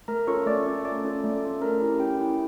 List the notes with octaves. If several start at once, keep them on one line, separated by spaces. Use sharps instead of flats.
A3 A#4 A#5
C#4 F4 A4 C#5 C#6
A3 D5 D6
C#4 F4 A4
A3 D5 D6
C#4 F4 A4
A3
C#4 F4 A4
C#4 A#4 A#5
E4 G4
C#4 G4 G5
E4 G4